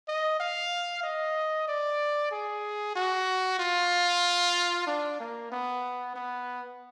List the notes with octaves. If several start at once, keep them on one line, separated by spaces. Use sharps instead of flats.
D#5
F5
D#5
D5
G#4
F#4
F4
D4
A#3
B3
B3